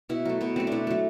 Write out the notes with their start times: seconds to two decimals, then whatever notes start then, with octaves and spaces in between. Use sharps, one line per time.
0.09 B2 E4
0.25 F#3 A3
0.41 B2 B3
0.56 F#3 A3 C4
0.67 B2 D4 E4
0.87 F#3 A3